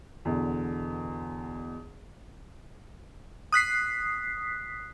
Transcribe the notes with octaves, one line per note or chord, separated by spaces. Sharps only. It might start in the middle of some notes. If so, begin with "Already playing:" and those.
E2 B2 D3
D#6 F#6 B6 C7